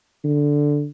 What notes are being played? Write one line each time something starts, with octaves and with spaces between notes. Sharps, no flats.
D3